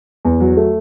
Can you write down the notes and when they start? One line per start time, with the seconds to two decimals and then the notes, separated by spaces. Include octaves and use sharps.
0.25 E2
0.40 F#3
0.57 A3